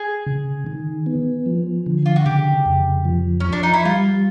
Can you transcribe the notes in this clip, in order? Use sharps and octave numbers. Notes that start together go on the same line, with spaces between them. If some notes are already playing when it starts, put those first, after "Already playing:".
Already playing: G#4
C#3
D#3
B3
F3
D3
F4
F#4
C#3 G4
F2
F3
F3 C#4
D4
D#4
E4
G3 F4